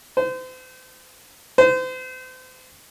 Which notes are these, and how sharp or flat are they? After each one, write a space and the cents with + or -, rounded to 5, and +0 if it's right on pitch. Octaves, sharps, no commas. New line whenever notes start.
C5 -35
C5 -35